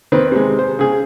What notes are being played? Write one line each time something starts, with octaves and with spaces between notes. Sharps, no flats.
D#3 C4 B4
C3 G#3
C5
C#3 G#4